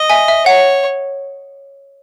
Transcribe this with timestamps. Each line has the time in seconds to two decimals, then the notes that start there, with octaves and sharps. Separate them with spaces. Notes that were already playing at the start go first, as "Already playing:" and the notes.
Already playing: D#5
0.10 E5 G#5
0.28 E5
0.46 C#5 F#5